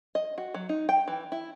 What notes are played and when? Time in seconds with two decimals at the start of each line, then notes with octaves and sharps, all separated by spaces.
0.15 D#5
0.38 F#4
0.54 F#3
0.69 D#4
0.89 G5
1.08 E3
1.32 E4